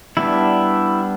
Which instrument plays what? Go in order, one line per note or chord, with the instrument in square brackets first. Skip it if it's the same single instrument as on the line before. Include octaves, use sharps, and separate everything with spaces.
[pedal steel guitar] G3 B3 D4 E4